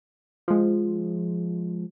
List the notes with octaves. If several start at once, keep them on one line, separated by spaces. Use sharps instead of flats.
F3 G#3